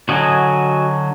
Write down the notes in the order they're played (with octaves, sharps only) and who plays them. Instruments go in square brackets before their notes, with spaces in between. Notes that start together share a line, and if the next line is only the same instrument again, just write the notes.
[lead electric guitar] D3 F#3 [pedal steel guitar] F#4 D#5 G#5